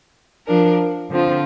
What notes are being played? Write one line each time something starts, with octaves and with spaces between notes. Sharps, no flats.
F3 D4 A#4
D3 F3 C4 F4